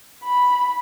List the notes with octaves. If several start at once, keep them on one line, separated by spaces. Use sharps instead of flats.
B5